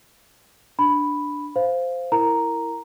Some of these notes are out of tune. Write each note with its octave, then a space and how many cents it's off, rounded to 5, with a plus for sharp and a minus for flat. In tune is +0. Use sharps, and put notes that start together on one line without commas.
D4 +0 B5 +0
C5 -10 F5 +0
E4 +0 A#4 -15 A#5 +0